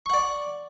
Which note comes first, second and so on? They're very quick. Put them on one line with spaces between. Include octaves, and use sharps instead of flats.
C#6 F#5 D5